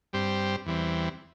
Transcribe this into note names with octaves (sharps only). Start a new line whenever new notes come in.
G2 G3 C4 G4 C5
E2 E3 G3 C4